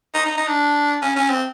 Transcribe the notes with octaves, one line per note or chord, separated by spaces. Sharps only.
D#4
D#4
D#4
D4
C#4
C#4
C4